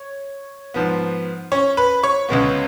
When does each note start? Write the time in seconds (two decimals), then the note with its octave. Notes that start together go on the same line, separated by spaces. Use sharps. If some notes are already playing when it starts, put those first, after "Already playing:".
Already playing: C#5
0.74 G#2 F3 B3
1.52 C#4 C#5
1.77 B4 B5
2.03 C#5 C#6
2.29 C#2 C#3 G#3 B3